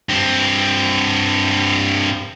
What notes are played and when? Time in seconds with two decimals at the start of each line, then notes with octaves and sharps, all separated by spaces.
0.09 G2 C4